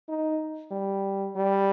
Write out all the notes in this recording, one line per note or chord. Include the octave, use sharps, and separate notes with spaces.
D#4
G3
G3